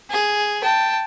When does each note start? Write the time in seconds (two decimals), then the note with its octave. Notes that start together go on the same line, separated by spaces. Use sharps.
0.11 G#4
0.63 G5 A5